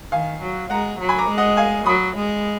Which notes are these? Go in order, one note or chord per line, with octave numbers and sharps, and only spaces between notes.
D#3 F5 G#5
F#3
G#3 F#5 A#5
F#3
G#5 B5
A#5 D6
G#3
D#5 F#5
F5 G#5
F#3 B5 D#6
G#3